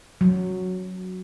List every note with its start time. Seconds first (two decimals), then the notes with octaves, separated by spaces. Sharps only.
0.21 F#3